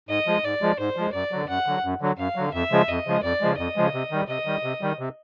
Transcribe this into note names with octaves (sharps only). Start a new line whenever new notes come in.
G#2 D#5
F3 G#3
G#2 D5
F3 G#3
G#2 C5
F3 G#3
F#2 D5
D3 F#3
F#2 F#5
D3 F#3
F#2
D3 F#3
F#2 F5
D3 F#3
F2 E5
C#3 F3 G#3
F2 D#5
C#3 F3 G#3
F2 D5
C#3 F3 G#3
F2 D#5
C#3 F3 G#3
C3
D#3 G3
C3 D#5
D#3 G3
C3
D#3 G3
C3